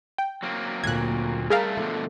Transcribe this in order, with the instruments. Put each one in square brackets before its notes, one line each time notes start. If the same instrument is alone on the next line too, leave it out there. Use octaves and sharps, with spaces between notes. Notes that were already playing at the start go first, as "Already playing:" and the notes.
[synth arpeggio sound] G5
[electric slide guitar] F#3 A#3 C4
[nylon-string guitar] D2 A#2 [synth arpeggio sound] F#6 G#6
[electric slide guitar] G3 A3 E5 [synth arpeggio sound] G#4 A#4 F5
[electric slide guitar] B2 D3 F3 [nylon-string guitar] A3